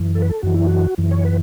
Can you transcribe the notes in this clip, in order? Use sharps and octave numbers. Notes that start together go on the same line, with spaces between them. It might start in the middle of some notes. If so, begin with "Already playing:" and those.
Already playing: F#2 E3
A4
B4
A4
F#2 E3 F#4
E4
F#4
F#2 E3
C#5
B4